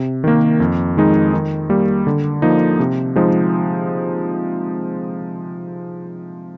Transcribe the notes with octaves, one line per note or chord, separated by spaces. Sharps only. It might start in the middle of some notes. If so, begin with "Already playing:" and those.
Already playing: C3
D#3 A#3
F2
D#3 G#3 D#4
D#3
G3 A#3
D3
F3 A#3 D#4
C3
F3 G#3 C4 D#4